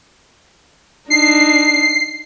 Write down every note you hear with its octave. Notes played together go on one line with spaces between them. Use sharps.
D4 D#4 C7